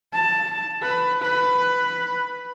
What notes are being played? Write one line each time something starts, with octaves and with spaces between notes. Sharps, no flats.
A5
B4
B4